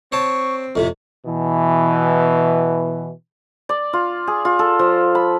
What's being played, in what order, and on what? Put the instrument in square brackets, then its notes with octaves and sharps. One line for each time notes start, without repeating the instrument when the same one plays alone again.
[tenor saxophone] C4 [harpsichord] C#5 A5 [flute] C#6
[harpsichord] F2 A2 C3 [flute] E5
[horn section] B2 E3
[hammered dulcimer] D5
F4
G#4
F4
A4
F3
B5